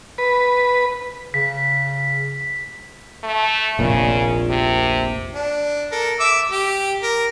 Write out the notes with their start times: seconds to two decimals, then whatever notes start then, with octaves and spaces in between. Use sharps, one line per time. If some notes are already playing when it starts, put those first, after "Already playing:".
0.18 B4
1.34 C#3 B6
3.23 A3
3.79 F1 A#1 A#2 C#3
4.50 C3
5.35 D4
5.92 A4 A#4
6.20 E5 D6 E6
6.51 G4
7.03 A#4